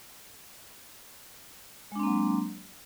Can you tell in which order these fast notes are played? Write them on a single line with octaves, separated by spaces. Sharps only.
G#3 D4 C4 A#3 F#3